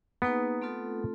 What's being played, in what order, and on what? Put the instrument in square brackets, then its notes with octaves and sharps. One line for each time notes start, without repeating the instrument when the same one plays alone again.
[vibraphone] A#3 D#4 G#4 B4 [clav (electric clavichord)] B3
[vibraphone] A3 C4 F4 A4